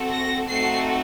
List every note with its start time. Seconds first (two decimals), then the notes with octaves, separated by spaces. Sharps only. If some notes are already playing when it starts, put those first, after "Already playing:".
Already playing: A3 C4 F#4 A4
0.08 A#6
0.47 A3 C4 D#4 F#4 A4 C7